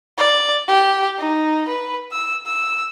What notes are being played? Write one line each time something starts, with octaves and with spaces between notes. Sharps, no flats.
D5
G4
D#4
B4
E6
E6